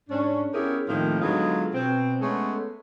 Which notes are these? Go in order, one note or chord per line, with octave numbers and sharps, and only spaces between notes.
G#2 C#4 D4
B3 C#4 E4 G4 G#4 A#4
D#2 A2 D#3 F3 A#3 C4
D3 F#3 G#3 B3 D#4 F4
B2 C4
G#3 A3 B3 C#4 G#4 A4